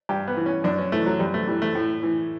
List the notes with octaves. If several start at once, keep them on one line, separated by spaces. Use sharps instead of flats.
G2 G4
B3
E3
C#4
F#2 D4
C#4
E3 A3
F#3
F#2 G3
A3
E3 G3
A3
A2
E3